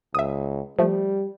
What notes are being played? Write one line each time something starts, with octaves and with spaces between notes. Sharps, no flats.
C#2 E5 D#6
F3 G3 A3